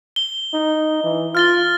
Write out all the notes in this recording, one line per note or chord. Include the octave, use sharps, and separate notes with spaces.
G7
D#4
E3
F4 F6 A6 G7